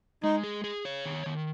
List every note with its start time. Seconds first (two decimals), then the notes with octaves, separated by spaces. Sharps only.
0.23 G#3 D#4
0.44 G#4
0.64 G#4
0.85 C#5
1.05 D#3
1.26 D#3